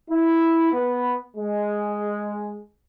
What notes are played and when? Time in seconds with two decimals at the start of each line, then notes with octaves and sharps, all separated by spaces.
0.11 E4
0.73 B3
1.37 G#3